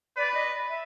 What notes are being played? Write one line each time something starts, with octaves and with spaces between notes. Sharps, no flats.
B4 D5
D#5
E5